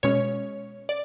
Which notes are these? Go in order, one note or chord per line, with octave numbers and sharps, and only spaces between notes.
B2 G#3 C#4 C#5
D5